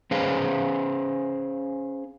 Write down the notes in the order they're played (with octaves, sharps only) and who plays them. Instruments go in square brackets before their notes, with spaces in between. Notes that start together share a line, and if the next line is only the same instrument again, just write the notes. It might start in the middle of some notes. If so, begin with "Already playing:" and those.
[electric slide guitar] C#4 G#4 B4 C5 F5